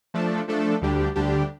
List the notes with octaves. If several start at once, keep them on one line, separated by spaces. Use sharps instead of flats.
F3 A3 D4 A4
F3 A3 D4 A4
D2 D3 G3 D4 G4
D2 D3 G3 D4 G4